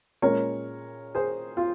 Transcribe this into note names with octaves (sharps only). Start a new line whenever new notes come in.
A#2 G#3 C#4 A#4 C#5
G#4 C5
F4